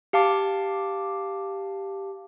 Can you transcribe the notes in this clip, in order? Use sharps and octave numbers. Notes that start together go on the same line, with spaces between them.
G4 F5 A5 D6